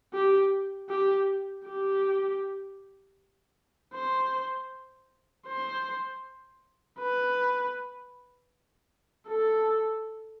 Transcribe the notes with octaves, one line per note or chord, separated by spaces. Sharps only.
G4
G4
G4
C5
C5
B4
A4